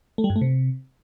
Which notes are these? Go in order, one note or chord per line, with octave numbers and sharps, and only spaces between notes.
A3
G3
G2
A3
C3